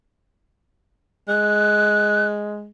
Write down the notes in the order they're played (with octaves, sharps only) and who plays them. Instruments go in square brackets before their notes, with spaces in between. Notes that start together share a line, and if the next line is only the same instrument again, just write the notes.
[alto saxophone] G#3 [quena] F#6